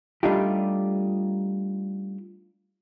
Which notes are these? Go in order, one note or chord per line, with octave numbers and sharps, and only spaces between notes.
G3 A3 D4 D#4 F4 G4